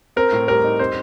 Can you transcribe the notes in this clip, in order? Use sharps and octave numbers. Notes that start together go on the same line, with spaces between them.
C4 A#4
A2
G3 A#4
D#4
C4 C5